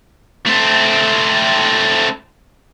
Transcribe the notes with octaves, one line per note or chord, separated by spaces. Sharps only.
A3 C4